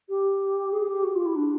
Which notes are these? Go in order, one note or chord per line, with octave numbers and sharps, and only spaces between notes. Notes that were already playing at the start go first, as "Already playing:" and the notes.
G4
G#4
G4
F#4
F4
E4
D4